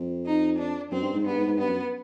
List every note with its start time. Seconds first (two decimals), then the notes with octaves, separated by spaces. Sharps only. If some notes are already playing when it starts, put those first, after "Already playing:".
Already playing: F2
0.25 D#4
0.58 D4
0.92 F#2 C4
1.03 G2
1.13 G#2
1.25 G2 B3
1.36 G#2
1.46 G#2
1.58 G2 B3
1.69 F#2